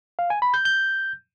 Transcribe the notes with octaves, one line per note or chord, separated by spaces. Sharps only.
F5
G#5
B5
G6
G6